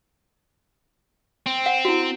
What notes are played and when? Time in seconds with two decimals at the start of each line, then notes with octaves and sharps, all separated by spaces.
1.46 C4
1.66 F#5
1.85 E4 F#4